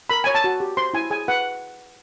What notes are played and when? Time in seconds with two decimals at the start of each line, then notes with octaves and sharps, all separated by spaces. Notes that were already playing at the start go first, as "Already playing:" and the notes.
0.10 A#4 B5
0.24 C#5 G#5
0.35 A5
0.44 F#4
0.60 G4
0.77 C5 C6
0.94 E4 G#5
1.10 G#4 G#5
1.28 B4 F#5